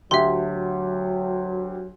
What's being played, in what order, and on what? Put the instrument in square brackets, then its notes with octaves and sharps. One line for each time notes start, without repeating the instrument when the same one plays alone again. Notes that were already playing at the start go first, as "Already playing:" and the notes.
[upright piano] D2 G4 [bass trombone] F#3 [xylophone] E5 C6